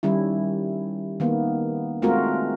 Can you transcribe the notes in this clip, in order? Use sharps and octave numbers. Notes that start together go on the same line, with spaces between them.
D#3 G3 C#4 E4
D#3 A#3 B3
G#3 A3 C4 F4 F#4 A#4